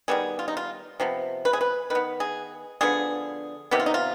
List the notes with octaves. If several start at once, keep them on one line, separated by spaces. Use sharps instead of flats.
D#3 G3 B3 G#4
F4
D#4
F4
C3 F3 B3
B4
G#4
B4
D#3 B3 B4
G#4
D3 F3 B3 G#4
C3 D#3 B3 G4
F4
D#4
F4